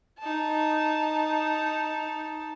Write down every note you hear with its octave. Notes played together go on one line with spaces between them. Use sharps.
D#4 A5